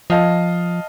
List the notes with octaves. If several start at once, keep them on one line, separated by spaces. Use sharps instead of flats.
F3 D#5 F5 A5